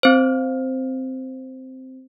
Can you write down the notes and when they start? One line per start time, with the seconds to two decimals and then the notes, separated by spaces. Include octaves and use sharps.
0.03 C4 C5